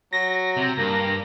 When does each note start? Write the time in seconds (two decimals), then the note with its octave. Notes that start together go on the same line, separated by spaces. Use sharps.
0.13 F#3 A#6
0.57 C3
0.78 G2 A#3